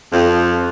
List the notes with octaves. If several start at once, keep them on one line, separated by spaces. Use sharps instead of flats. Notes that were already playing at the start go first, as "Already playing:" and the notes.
F2